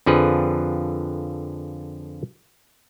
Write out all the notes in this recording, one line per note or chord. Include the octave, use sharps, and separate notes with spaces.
F2 D3 F3 G#4 B4